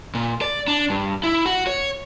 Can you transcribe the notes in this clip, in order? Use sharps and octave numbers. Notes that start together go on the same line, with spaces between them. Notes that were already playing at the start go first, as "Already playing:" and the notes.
A#2
D5
D4
G2
E4
F#4
C#5